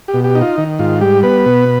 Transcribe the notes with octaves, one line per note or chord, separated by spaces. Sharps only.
G4
B2
G4
D#4
F4
D#3
G#2 F4
G3 G4
B3 B4
B2